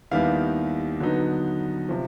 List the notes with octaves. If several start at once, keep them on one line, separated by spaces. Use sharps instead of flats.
D#2 D#3 G3 B3 E4 F5
D3 F#3 B3 D#4
C3 F3